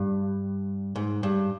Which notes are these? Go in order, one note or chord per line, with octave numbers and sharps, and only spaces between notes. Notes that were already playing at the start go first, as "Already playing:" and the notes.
Already playing: G2
G#2
G2